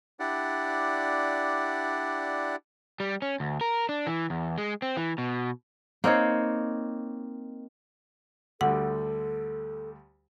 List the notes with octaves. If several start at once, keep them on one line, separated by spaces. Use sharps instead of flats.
D4 E4 G4 D5 F#5
G3
C#4
D2
A#4
D4
E3
E2
G#3
C4
E3
B2
A#3 C4 D#4 C#5
D2 D3 G3 A4 F#5